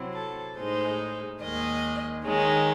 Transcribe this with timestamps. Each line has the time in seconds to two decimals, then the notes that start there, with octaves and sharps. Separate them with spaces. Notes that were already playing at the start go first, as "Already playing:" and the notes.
Already playing: C3 F#3 C4 E4
0.14 A4
0.56 A2 G#3 D#4 C5
1.41 D#2 D#3 G#3 D#5
2.25 D#3 G#3 D#4 C#5